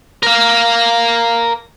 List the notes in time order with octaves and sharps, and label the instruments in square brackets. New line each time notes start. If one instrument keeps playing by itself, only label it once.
[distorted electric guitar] A#4 F5